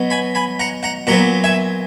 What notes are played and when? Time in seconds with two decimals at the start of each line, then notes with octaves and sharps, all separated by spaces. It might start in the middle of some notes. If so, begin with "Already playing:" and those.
Already playing: B2 F#3 B3
0.10 G#5 B5
0.35 G#5 B5
0.59 F#5 A#5
0.83 F#5 A#5
1.07 A#2 F#3 B3 F#5 A#5
1.44 E5 G#5